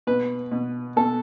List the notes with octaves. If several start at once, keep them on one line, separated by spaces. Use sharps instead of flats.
B2 B4
B2
B2 A4